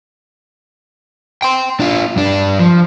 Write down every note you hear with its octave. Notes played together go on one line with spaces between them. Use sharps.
G5 C6
D4 F4
G2 D4
F3